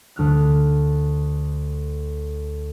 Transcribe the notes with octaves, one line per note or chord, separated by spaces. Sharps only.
D2 F6 F#6